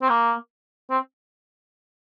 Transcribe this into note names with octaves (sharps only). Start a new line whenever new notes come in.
C4
A#3
C4